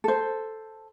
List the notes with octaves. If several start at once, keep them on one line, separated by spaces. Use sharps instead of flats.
A4 C5